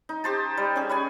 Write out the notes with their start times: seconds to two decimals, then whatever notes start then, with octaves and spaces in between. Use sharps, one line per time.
0.09 D#4
0.24 G4 C5 A5
0.57 G3
0.76 C#4 G#4
0.89 B4 C#5 G#5